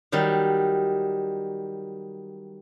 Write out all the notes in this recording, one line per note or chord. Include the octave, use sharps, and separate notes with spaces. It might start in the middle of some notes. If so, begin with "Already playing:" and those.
D#3 F#3 G3